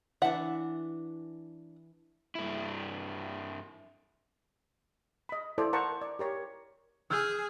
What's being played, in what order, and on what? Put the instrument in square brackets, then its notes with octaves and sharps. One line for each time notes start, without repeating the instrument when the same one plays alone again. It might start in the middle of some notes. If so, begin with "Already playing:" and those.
[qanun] E3 D4 [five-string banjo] E5 F#5
[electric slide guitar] G2 E4
[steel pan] D#5 B5
E4 A4 C5 D5
A#4 C5 F#5 A5 A#5 C#6
D5
G4 A#4 C#5
[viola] G#4 [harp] E6 F6 G6